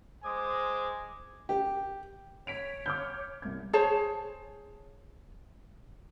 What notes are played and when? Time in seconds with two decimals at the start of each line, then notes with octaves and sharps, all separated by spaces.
0.24 G#3 C5 G#5 D6 D#6
1.49 G4
2.47 C#5 B6 D7 F7
2.86 D6 F6 G6
3.42 C2 G#6
3.73 G#4 C5 C#5 A5